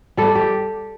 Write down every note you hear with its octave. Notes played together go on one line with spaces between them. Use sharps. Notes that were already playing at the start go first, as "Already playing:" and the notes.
G3 A4
G4